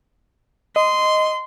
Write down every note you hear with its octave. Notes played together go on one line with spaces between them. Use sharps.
D#5 C6